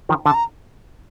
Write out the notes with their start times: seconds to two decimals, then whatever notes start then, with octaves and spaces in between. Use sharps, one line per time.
0.09 D#3 F3
0.25 D3 A5
0.34 A#5